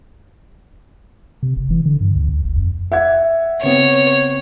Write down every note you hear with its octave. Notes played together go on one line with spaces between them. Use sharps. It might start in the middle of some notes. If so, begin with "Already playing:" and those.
C3
F1
E3
D3
G2
D2
D#2
F#1
F2
E5 F#5 G#6
C#3 B3 C4 C#5